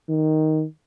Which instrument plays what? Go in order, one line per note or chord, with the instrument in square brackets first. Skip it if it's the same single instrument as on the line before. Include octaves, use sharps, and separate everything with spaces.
[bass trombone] D#3